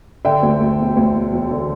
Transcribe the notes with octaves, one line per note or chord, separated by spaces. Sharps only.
D3 E5 G5
D2
D2
E1
D2
E1
E1
D3